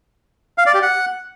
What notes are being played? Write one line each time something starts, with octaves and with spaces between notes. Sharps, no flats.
F5
D5
G4
F#5